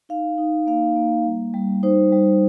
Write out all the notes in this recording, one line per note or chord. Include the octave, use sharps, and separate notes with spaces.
D#4 F5
D#4
A#3 F5
A#3
G3
G3
D#4 C5
G3